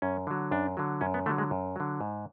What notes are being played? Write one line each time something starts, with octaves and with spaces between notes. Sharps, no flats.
F#2 C#4
D3 F#3
F#2 D4
D3 F#3
F#2 C#4
B3
D3 F#3 A3
G#3
F#2
D3 F#3
G#2